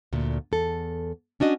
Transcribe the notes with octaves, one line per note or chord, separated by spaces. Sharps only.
D2 A#2
E2 A4
C#4 D4 F#4 D#5